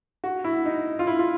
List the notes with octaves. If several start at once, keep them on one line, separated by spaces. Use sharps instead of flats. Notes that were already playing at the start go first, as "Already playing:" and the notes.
F#4
E4
D#4
F4
E4
F4